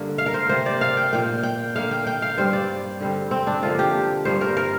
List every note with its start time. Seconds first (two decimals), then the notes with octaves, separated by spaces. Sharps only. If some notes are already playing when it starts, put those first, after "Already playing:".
Already playing: G2 D3 A#3
0.18 F5
0.26 A#4
0.34 C5
0.49 C3 A#3 C5
0.66 D5
0.81 F5
0.97 G5
1.12 A#2 A#3 G5
1.43 G5
1.75 D3 A#3 F5
1.91 G5
2.07 G5
2.22 F5
2.38 G2 G3 C4 C5
2.53 D5
3.00 D3 G3 C4
3.31 C4
3.47 D4
3.62 D3 F3 A#3 F4
3.79 G4
4.25 G2 G3 A#3 C5
4.41 A#4
4.57 A#4